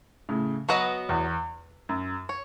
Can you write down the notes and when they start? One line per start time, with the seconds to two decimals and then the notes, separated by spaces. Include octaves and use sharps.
0.29 A2 C#3
0.69 F#3 B3 F#4 B4 D#5
1.09 E2
1.89 F#2
2.29 C#5